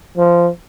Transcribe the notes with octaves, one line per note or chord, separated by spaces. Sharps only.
F3